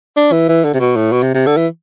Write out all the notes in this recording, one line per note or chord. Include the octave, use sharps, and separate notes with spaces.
D4
E3
E3
D3
C3
B2
A2
B2
C3
C3
D3
E3